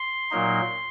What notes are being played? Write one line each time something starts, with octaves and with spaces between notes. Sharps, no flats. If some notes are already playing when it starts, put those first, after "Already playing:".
Already playing: C6
A#2 F#3 A#3 D#4